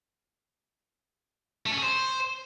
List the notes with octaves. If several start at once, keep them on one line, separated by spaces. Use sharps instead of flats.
A3
C#4
G#4
C5